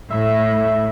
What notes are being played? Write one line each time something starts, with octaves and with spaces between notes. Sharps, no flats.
A2 E5